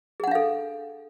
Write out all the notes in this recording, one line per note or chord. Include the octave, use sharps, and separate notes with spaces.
D4 G#4 A4 F5 F#5